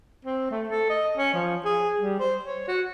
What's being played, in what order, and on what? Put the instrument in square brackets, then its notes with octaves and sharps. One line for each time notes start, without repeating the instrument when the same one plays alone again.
[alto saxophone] C4
A3
A4
D#5
C#4
F3
G#4
G3
C5
C#5
F#4